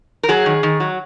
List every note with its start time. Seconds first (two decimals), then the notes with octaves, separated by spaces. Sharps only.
0.23 A#4
0.29 F#3 G#4
0.46 D#3
0.63 D#3
0.80 F#3